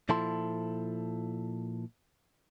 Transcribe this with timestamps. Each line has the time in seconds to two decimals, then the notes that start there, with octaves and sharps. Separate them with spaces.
0.09 A#2 F3 E4 A4 A5 C6